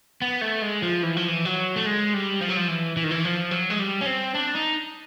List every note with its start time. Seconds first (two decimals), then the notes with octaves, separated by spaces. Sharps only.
0.22 B3
0.41 A3
0.62 G#3
0.82 F3
1.03 E3
1.17 F3
1.28 E3
1.45 F#3
1.76 A3
1.86 G#3
2.14 G3
2.41 F3
2.49 F#3
2.57 F3
2.68 E3
2.97 E3
3.04 D#3
3.11 E3
3.25 F3
3.51 F#3
3.70 G#3
3.79 G3
4.01 C#4
4.06 C4
4.35 D4
4.55 D#4